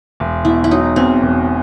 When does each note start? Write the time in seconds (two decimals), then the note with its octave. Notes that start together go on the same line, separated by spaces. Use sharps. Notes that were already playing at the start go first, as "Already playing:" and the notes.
0.20 E1
0.45 B2 E4
0.64 E4
0.71 F#3 D#4
0.96 E2 C4
1.22 E1